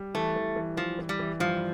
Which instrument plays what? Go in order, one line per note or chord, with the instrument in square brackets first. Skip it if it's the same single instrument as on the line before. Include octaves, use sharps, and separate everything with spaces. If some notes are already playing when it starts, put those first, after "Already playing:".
Already playing: [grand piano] G3
[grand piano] E3 [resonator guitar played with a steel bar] A3
[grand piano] E3
E3
[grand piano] E3 [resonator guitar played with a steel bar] F3
[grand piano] E3
[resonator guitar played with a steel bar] G3
[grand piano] E3
[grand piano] G2 [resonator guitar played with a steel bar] F3